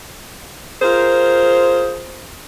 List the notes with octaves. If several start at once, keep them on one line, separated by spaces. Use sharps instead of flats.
F4 G#4 A#4 C5